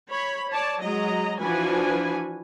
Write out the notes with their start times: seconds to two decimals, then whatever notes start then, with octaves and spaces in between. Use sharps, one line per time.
0.10 C#5 B5
0.51 C#5 D5 A5
0.81 F#3 G#3 D#5 A#5
1.39 E3 F3 D4 F#4 B4 G#5